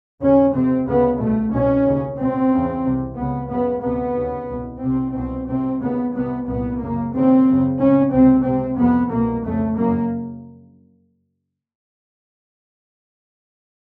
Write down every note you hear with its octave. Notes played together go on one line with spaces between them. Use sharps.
D#2 C#3 C#4
F2 C3 C4
D2 C#3 B3
C2 B2 A3
C2 B2 C#4
D#2 C#3
C#2 B2 C4
E2 C#3
C2 C3
C#2 C#3 B3
F#2 C#3 B3
D2 C3 B3
D#2 C#3
C2 B2
C2 C3 C4
C2 B2 C4
C2 C3 C4
D#2 C#3 B3
C2 C3 B3
C2 A#2 B3
F#2 C#3 A#3
D#2 C#3 C4
F#2 C#3
C#2 C#3 C#4
C#2 C3 C4
C#2 C3 C4
F2 C3 B3
C2 B2 A#3
F2 C#3 A3
F#2 C#3 A#3